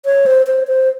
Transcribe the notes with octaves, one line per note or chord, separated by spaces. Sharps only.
C#5
C5
C5
C5